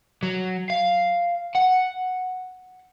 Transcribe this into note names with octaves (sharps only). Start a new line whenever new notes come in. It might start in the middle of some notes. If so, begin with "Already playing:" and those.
F#3
F5
F#5